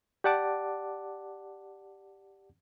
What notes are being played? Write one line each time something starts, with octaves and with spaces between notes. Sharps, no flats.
G4 D5 F#5 A5 D6